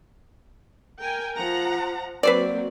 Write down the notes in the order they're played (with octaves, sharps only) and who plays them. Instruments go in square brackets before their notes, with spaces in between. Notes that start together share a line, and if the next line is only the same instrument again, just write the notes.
[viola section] A#4 G5 G#5
F3 F#5 A#5
[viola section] F#3 A#3 C4 [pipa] B4 C5 D5